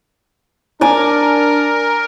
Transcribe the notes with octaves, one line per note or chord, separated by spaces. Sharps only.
D4 A#4 D5 G#5 A#5